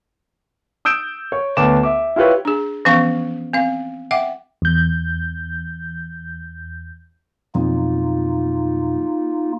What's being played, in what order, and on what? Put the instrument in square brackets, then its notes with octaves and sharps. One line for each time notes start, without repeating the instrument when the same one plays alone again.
[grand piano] D#6 E6 G6 D7 E7
C#5
D2 B3 C#5 A5 D6 E7
E5 D6
E4 F4 G4 B4 C#5
[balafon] D4 G#4
E3 F3 B3 C#4 F5 C#6
C4 F5
E5 F#5 G5 D6
[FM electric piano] E2 G6
[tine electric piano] F2 B2 F#3 [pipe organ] A#3 D#4 F4